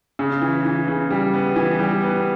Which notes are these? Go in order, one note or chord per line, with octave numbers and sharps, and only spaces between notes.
C#3
E3
E3
C#3
G3
B3
E3
G3
B3